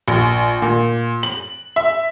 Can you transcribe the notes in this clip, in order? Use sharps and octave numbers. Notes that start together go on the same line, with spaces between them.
A#1
A#2
F#7
E5